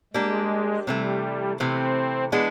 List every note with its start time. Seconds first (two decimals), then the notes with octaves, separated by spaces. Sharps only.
0.14 G3 G#3 A#3 D4 G4
0.87 C3 E3 G3 A3
1.59 C3 E3 A3 C4
2.32 E3 G#3 B3 D4